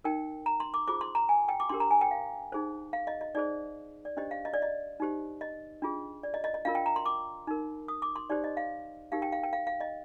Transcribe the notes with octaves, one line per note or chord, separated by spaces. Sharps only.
D#4 A#4 G5
A#5
C6
D6
F4 G#4 C5 D6
C6
A#5
G#5
G5
D6
D4 G4 A#4 C6
A#5
G#5
G5
F5
D#4 G#4 C5
F5
D#5
D#5
D#4 G#4 C5 D5
D5
D4 G4 C5 D#5
F5
D#5
D5
D#5
D#4 G4 C5
D#5
D4 F4 G#4
D5
D#5
D#5
D#5
D4 F4 A#4 F5
G5
A#5
C6
D6
D#4 A#4
D#6
D6
C6
D#4 G4 C5 D5
D#5
F5
D#4 G4 A#4 F5
G5
F5
G5
F5
F5
D#5